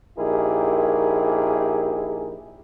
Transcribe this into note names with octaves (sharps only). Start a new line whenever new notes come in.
A#1 D#4 E4 G4 G#4 A#4